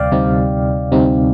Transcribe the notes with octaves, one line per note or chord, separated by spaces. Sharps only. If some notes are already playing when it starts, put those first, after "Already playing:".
Already playing: D2 C3 G3 C4 D5 F5 G5
D2 C3 G3 C4 D#4
D2 C3 G3 C4 D#4